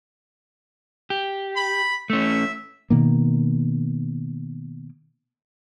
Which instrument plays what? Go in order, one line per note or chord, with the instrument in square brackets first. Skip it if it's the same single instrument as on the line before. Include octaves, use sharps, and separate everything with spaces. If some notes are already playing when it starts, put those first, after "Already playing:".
[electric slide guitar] G4
[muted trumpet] B5
[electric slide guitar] A3 C#4 [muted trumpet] E5
[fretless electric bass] B2 D#3 A#3